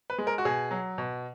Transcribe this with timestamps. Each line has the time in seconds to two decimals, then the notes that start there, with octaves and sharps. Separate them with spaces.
0.10 B4
0.18 G#3
0.27 A#4
0.38 F#4
0.45 B2 G#4
0.71 F#3
0.98 B2